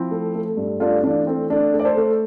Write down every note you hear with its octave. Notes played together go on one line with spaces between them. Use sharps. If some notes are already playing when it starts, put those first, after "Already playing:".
Already playing: F3 C4 E4
A3
A3
G2
A3 D4 F4
E3 D4
A3 C4
A3 D4
A3
D5
A4 C5
A3